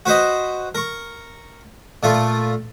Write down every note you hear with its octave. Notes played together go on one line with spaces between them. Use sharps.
F#4 B4 C5 D#5
A#4 C#6
A#2 A3 F4